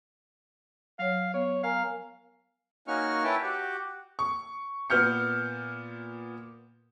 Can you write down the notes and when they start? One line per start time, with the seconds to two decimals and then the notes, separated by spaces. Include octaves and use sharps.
0.99 F#3 C#5 F5
1.34 B3 C#5
1.64 A#4 F5 G#5 A#5
2.88 A#3 C#4 D#4 F#4 C#6 F6
3.24 E4 B4 C#5 E5 G5 A5
3.43 F#4 G4
4.19 C#6
4.90 A#2 B3 F6 G6 C#7